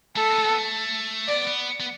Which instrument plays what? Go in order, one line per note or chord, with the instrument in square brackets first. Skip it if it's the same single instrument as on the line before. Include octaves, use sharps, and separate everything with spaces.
[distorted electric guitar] A3 [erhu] A4
[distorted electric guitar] B3
A3
B3
A3
[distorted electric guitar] B3 [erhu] D5
[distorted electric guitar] B3
B3